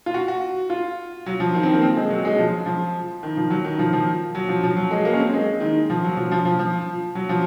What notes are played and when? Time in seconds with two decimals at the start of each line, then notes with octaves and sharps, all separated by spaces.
0.06 F4
0.14 F#4
0.28 F#4
0.70 F4
1.26 F#3
1.40 F3
1.54 D#3
1.63 C4
1.73 A#3
1.82 C4
1.96 G#3
2.10 F#3
2.25 G#3
2.39 F3
2.66 F3
3.23 D#3
3.37 F3
3.50 F#3
3.65 D#3
3.79 F3
3.93 F3
4.35 F#3
4.49 F3
4.63 F3
4.77 F#3
4.91 G#3
5.05 A#3
5.13 C#4
5.19 C4
5.34 G#3
5.60 D#3
5.90 F3
6.04 F#3
6.17 F3
6.31 F3
6.45 F3
6.59 F3
7.15 F#3
7.29 F3